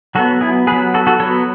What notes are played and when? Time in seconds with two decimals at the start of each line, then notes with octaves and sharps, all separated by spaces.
0.15 F#3 F#4 A4
0.19 B3
0.41 E4 G#4
0.67 F#3 B3 G#4 B4
0.94 F#4 A4
1.07 F#4 A4
1.20 F#3 B3 A4 C#5